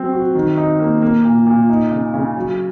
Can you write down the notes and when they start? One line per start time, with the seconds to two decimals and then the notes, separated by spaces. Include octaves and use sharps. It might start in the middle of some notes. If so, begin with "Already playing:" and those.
Already playing: F#3 C4
0.12 F#4
0.35 D#3
0.57 D#4
0.79 A#3
1.02 A#3
1.25 A#2
1.46 A#2
1.69 D#4
1.91 C#3
2.14 C#3
2.36 F#3